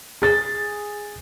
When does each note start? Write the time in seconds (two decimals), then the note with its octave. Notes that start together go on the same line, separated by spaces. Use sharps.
0.22 G#4 A6